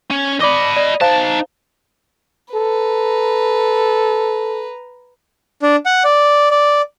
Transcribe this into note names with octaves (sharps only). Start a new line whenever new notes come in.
C#4
D5 D#5 B5 D6 G7
D5
D#4 C5 F5 A5
A4 B4 A#5
D4
F#5
D5
D5